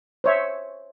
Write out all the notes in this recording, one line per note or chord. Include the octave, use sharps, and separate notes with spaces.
C5 C#5 E5